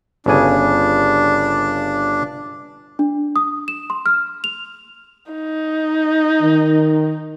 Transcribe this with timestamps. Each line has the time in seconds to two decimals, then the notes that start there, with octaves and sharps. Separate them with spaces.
0.26 G1 C#3 D4 G#5
2.99 D4
3.36 D#6
3.68 E7
3.90 C6
4.06 F6
4.44 F7
5.31 D#4
6.42 D#3